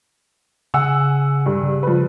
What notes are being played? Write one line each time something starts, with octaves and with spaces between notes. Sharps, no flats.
C#3 F#5 G#5 E6
G2
C#3
F3 B4